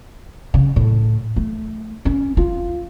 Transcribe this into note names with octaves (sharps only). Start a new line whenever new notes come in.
C#3
A2
A3
C#4
F4